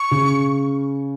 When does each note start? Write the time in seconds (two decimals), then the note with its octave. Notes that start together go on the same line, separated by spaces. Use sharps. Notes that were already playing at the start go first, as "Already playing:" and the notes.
Already playing: C#6
0.11 C#3